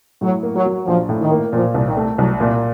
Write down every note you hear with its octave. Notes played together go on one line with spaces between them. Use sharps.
A2 F#3
A#3
F#3
F#3
A#1 F3
A2
D#3
A#3
A#2 F3
C2
D#3
A3
C2 F#3
A#2